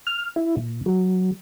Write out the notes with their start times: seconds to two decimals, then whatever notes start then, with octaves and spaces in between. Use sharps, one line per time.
0.07 F6
0.36 E4
0.57 A#2
0.86 F#3